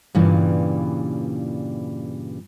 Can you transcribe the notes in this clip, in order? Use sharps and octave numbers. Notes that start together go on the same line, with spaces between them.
G2 A#2 C#3 E3 G3